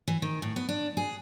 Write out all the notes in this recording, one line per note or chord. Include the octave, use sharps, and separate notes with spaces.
E3
D#3
A2
B3
D4
G#4